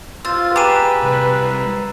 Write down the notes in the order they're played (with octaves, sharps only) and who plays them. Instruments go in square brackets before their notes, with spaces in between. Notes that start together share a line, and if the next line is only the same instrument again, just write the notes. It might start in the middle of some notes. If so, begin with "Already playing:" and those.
[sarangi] F4 [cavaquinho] C5 [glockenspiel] E6 A6
[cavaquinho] G4 G#4 [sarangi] B4 [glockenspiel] A#5 D#7 E7
[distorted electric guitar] C2 G3